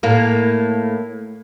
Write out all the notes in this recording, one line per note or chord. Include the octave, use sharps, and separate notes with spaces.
A2 A#3